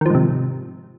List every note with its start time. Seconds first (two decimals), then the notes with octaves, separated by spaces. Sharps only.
0.01 D#3
0.06 F3
0.10 G#2
0.15 C3